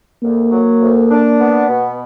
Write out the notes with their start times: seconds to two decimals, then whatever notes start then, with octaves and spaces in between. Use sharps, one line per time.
0.23 D2 A#3
0.52 F#3
0.82 D2
1.11 D4
1.40 B3
1.69 B2